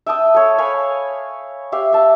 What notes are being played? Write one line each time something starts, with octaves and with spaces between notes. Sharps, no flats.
E5 G5 A5 D#6
A4 C#5
C#5 F5 G#5 B5
G4 E5 F5
E5 A5